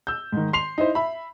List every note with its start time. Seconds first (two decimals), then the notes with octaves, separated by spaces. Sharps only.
0.07 E6 G6
0.32 G#2 D#3
0.53 C6 C7 F7
0.78 D#4 E4 C5
0.95 E5 B5